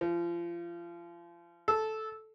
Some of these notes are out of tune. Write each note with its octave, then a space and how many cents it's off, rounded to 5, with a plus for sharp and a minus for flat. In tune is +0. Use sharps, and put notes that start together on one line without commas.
F3 -30
A4 -10